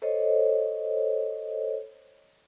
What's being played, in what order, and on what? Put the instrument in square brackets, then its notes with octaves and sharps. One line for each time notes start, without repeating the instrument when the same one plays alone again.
[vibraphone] A4 C5 C#5 D#5